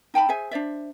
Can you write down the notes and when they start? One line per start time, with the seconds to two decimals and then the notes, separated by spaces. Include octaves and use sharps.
0.14 D#4 G5 A5 B5
0.29 G#4 C5 E5 G#5
0.51 D4 C5 D5 E5